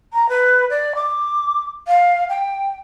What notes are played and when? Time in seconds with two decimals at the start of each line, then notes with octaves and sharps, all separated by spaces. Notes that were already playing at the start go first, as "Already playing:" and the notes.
0.13 A#5
0.29 B4
0.70 D5
0.96 D6
1.88 F5
2.29 G5